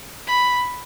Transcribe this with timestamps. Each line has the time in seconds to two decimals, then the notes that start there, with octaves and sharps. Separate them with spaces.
0.27 B5